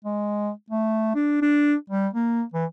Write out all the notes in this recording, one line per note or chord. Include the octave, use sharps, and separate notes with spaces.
G#3
A3
D4
D4
G3
A#3
E3